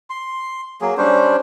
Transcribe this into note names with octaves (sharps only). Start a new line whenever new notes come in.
C6
F#3 A#3 G#4
G3 C#4 D4 C5